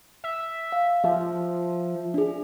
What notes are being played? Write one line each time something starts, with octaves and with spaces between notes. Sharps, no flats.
E5
F5
F3 E5
D4 G#4